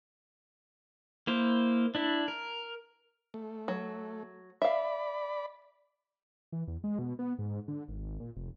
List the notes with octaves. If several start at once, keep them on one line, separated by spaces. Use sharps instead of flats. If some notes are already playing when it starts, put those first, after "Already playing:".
A#3 E4 C5
D4 E4
A#4
A3
F#3
D5 E5 F5 B5
E3
E2
G#3
B2
B3
G#2
D3
G#1
A#2
F1